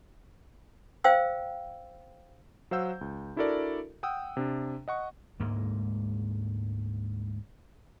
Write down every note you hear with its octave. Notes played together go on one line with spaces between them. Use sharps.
C5 F5 G5 E6
F#3 C5 F5 F#5 E6 G6
C#2
D4 E4 F#4 A4 A#4 D5
F#5 G5 D#6 E6
C3 D4
D#5 F#5 C#6
D2 G#2 G#3 A#3